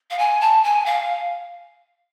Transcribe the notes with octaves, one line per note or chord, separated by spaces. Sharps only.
F5
G#5
A5
G#5
F5